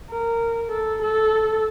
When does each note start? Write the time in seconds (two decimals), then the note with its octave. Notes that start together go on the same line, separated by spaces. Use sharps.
0.11 A#4
0.71 A4
1.02 A4